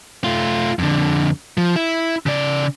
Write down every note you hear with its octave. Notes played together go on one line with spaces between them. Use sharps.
A3 F4
F2 D3
F3
E4
C#3 D5